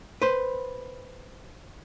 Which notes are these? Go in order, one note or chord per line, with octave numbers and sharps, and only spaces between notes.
B4 C5